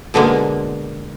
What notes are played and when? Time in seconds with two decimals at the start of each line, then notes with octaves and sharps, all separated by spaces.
0.14 B2 D3 G#3 A#3